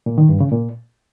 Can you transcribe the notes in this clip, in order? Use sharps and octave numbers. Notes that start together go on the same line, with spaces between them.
A#2
D#3
G2
C#3
A#2